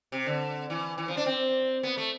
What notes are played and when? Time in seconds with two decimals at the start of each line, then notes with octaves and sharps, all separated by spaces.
0.12 C3
0.26 D3
0.70 E3
0.98 E3
1.08 F3
1.17 D4
1.26 C4
1.83 B3
1.97 A3